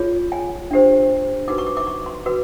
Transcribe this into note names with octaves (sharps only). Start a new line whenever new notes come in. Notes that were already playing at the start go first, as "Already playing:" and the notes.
Already playing: F4 G#4 C#5
G#5
D4 G4 C5
D#4 F#4 B4 D6
C#6
D6
D6
C#6
C6
F#4 B4